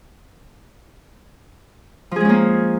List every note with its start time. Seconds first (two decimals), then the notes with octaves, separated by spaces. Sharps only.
2.11 F3
2.16 G#4
2.20 G#3
2.25 C#4
2.29 A#3